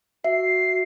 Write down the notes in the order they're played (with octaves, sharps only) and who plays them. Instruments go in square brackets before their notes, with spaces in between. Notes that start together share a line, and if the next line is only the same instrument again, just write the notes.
[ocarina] F#4 [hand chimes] E5 [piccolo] C7